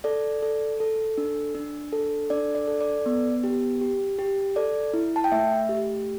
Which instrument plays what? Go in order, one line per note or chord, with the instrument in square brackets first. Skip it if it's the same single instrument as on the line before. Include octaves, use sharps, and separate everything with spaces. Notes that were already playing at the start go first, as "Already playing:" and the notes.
[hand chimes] A4 D5
A4
A4
D4
D4
A4
D4 D5
D5
A4
D5
B3
G4
G4
G4
A4 D5
E4
A5
G5
A3 E5
G4